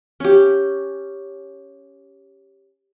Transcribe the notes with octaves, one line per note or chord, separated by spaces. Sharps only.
C#4 G4